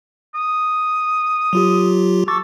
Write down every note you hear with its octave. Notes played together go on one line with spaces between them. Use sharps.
D#6
F#3 F4 G4
A4 C#6 D6 A6